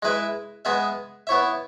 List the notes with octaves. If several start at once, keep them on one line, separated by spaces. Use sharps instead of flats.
G#3 E4 B4 E5
G#3 B3 G#4 E5
B3 E4 C#5 E5